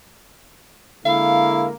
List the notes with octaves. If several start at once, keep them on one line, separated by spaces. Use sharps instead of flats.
D3 G#3 A#3 E4 F5